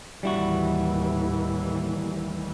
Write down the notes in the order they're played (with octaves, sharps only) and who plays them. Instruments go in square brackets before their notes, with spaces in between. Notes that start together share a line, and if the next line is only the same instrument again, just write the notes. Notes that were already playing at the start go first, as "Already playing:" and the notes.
[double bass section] D#2 A2 E3 [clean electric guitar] G3 E4 F#4